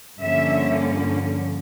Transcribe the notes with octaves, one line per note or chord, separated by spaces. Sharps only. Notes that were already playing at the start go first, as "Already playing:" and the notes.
G2 D3 F3 A#3 C#4 E5